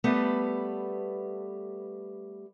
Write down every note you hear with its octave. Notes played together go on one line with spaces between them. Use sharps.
G3 A3 B3 A4 B4